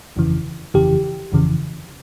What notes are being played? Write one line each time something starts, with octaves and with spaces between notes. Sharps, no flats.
G1 F2 C#3 E3
G1 F2 C#3 E3 G4
G1 F2 C#3 E3